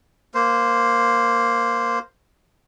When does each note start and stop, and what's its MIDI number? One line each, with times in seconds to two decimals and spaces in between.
0.34 1.99 58
0.34 1.99 72